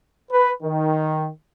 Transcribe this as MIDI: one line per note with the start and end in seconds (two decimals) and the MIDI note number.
0.31 0.50 71
0.62 1.28 51